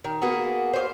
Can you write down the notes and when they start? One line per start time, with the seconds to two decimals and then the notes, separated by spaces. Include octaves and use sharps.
0.04 D#3
0.22 A#3 B3 F#4 G#4
0.73 C5 C#5 F5